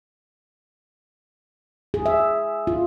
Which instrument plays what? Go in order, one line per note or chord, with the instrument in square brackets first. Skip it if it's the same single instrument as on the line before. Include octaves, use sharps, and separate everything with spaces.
[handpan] G#4
E5
F4